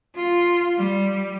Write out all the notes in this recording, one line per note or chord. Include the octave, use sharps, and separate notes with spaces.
F4
G3